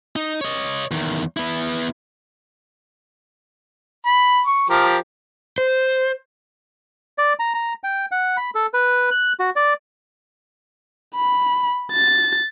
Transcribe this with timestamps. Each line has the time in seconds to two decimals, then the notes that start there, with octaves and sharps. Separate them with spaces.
0.16 D#4
0.41 C#5 D#5
0.91 E2 D#3
1.37 B3 E4
4.06 B5
4.46 C#6
4.70 F3 G4 A#4
5.58 C5
7.18 D5
7.39 A#5
7.54 A#5
7.84 G5
8.12 F#5
8.37 B5
8.55 A4
8.74 B4
9.11 F#6
9.40 F#4
9.56 D5
11.16 B5
11.93 A6